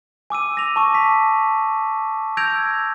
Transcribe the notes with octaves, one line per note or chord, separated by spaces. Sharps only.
G#5 D6 E6 D#7
A#6 F7
A5 C#6 D6
B6
E6 G6 G#6 A#6 D7 F7